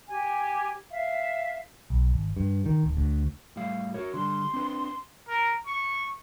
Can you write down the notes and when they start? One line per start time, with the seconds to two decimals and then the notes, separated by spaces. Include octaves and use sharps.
0.09 G4 G#5
0.91 E5 F5
1.90 B1
2.14 G#1
2.37 G2
2.66 D#3
2.83 D1
2.97 D2
3.56 A2 G3 F5
3.94 F#4 A#4 C#5
4.14 D3 G3 C6
4.54 C4 D4 B4
5.28 A#4
5.66 C#6